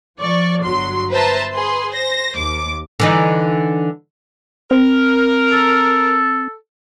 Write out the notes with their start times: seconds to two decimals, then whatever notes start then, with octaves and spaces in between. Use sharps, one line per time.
0.20 F3 D5 C#6
0.64 G1 F#3 C6
1.12 B4 C5 E5 A5 A#5
1.53 G#4 B4 C6
1.92 C5 A#6
2.36 D#2 D6
3.00 D3 E3 D#4
4.71 C4 A#4
5.52 A4